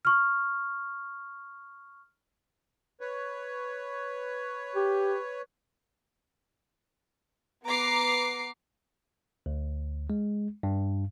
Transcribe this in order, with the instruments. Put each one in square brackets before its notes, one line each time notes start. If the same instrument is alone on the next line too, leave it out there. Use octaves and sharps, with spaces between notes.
[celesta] C#6 F6
[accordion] B4 C#5
[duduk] G4
[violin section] B3 A#5 D6 C7
[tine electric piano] D2
G#3
G2